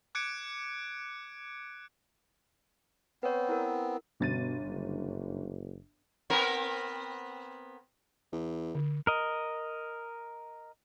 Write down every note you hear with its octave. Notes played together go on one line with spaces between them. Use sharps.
D6 F#6 G#6 C#7 D7
B3 C4 B4 C#5
E4 A#4
G1 B2 A6 D#7
F#1
B3 C4 A#4
E2
D3
A#4 D#5